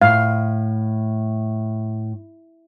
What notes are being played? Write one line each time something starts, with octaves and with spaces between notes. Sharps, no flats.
A2 F5